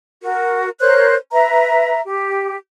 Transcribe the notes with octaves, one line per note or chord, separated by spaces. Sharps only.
F#4 A#4
A#4 C5 C#5 F#6
B4 E5 A#5
G4